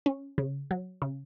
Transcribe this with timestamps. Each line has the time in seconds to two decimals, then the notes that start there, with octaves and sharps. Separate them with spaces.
0.06 C#4
0.38 C#3
0.71 F#3
1.02 C#3